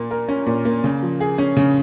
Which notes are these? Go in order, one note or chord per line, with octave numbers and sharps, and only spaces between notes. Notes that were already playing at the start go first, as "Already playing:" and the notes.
Already playing: A#2 A#3
A#4
C#4
A#2
A#3
C#3
F3
G#4
C#4
C#3